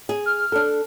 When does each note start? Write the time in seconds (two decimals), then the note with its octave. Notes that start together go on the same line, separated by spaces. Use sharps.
0.09 G#4
0.26 F6
0.52 D4 A4